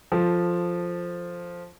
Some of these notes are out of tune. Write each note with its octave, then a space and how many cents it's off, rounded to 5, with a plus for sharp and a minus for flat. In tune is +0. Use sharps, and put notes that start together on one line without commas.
F3 +0 A4 +0